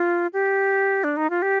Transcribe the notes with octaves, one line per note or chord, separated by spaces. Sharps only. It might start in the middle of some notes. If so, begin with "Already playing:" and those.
Already playing: F4
G4
D4
D#4
F4
G4